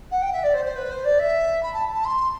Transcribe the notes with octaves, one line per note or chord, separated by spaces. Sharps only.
F#5
G5
E5
D5
C5
C5
B4
C5
D5
E5
B5
A5
A5
C6